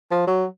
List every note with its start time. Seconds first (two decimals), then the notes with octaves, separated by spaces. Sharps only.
0.11 F3
0.27 F#3